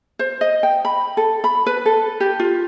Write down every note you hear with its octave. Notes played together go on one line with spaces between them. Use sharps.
C5
D#5
G5
B5
A4
B5
B4
A4
G4
F4